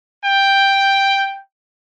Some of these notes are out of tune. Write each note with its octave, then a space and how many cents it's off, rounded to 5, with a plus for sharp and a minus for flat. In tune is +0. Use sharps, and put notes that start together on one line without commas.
G5 +5